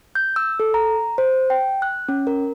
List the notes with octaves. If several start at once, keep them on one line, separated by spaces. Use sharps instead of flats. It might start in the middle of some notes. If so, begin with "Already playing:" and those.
G6
E6
A4
A#5
C5
G5
F#6
C#4
A#4